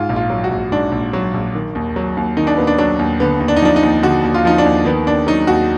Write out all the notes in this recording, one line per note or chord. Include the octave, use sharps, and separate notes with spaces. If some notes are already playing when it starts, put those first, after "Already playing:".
Already playing: G#2 F4
A#1
F4
F#3
F#4
A#1
G#2 D4
A#1
F#3
A#1
D#3
D#2
F#3
D#2
D#3 D#4
D4
D#2 B3
D4
F#3 D4
D#2
D3 B3
D#2
D4
D#4
F3 D4
D#4
D#2
D3 F#4
D#2
F4
F3 D#4
D4
D#2
D#3 B3
D#2 D4
F#3 D#4
D#2 F#4